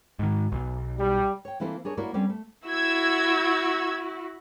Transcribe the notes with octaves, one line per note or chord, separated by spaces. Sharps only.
G#2 D#3
B1
G3
C#5 G5
E3 A#3 C4 E4 F4 A4
D4 G#4 A#4 C#5
A#3 E4 F#4 A#4 C#5 D5
G3 C4 C#4 A4 C#5 D5
A3
E4 F#4 E6 G#6